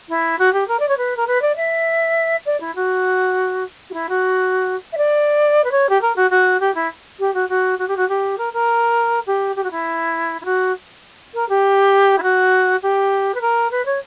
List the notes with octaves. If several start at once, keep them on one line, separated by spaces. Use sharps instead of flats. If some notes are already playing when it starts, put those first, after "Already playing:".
E4
F#4
G4
A#4
D5
C#5
B4
A#4
B4
D5
E5
D5
E4
F#4
F#4
E4
F#4
E5
D5
B4
C#5
G4
A#4
F#4
F#4
G4
E4
G4
F#4
F#4
F#4
G4
F#4
G4
A#4
A#4
G4
G4
F#4
E4
E4
F#4
A#4
G4
E4
F#4
G4
B4
A#4
B4
C#5